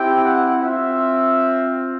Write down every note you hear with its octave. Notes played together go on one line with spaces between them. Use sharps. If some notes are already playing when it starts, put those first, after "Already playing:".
Already playing: C4 E4 G4 G5
F#5
C4 F4 E5